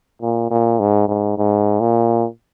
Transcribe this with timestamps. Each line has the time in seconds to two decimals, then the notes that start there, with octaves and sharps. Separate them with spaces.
0.22 A#2
0.51 A#2
0.79 G#2
1.08 G#2
1.38 G#2
1.80 A#2